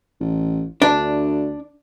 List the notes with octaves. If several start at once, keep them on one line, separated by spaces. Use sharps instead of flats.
A1
D2 D4